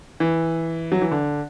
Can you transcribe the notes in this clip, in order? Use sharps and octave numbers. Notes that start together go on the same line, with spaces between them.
E3
F#3
E3
D3